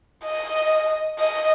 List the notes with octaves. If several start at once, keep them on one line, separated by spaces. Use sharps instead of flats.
D#5
D#5